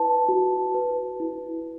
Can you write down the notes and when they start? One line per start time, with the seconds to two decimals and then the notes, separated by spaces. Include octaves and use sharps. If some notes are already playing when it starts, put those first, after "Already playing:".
Already playing: E4 B4 A5
0.29 F#4
0.74 B4
1.20 E4